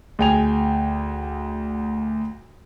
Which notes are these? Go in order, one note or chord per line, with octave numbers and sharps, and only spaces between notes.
D2 G#4 G5 G#5 F7